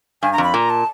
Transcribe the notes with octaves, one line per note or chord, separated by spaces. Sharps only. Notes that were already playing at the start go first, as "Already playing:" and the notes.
G2 G#5
A#5
F2
B5
A#2 A#5
A5